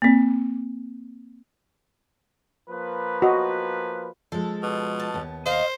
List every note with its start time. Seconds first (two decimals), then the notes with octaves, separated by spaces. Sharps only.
0.02 A#3 C4
2.69 F3 A#3 B4
3.22 F#4 D#5
4.32 F3 G#3 A4
4.63 B2
5.00 A5
5.14 D#2 B3
5.46 C5 D#5 F5